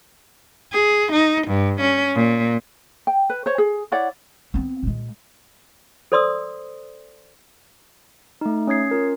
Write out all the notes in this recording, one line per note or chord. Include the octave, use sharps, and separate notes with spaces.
G#4
D#4
G2
C#4
A#2
G5
B4
C5 C#5
G#4
E4 C#5 D5 F#5
B3 C4
A#2 G#3
A4 C5 D5 C6 D#6 E6
A3 D#4
C#4 C#5 D#6 G#6 C7
C#4 F4 A#4